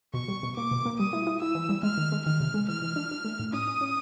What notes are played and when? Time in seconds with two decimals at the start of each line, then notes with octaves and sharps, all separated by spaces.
0.14 B2 C#6
0.28 G3
0.43 B2
0.57 A#3 D6
0.71 B2
0.85 A#3
0.99 G3 D#6
1.13 E4
1.27 E4
1.41 E4 E6
1.55 E3
1.69 G3
1.83 G#3 F6
1.97 D#3
2.12 G#3
2.26 D#3 F6
2.40 C3
2.54 G#3
2.68 E3 F6
2.82 E3
2.96 D4
3.11 D4
3.25 A3
3.39 A2
3.53 C#4 D#6
3.67 C#4
3.81 C#4